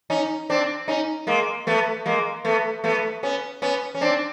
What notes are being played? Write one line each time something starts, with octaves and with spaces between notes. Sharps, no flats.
C#4 D#4
C4 D4
C#4 D#4
G#3 A#3
A3 B3
G#3 A#3
A3 B3
A3 B3
B3 C#4
B3 C#4
C#4
C4 D4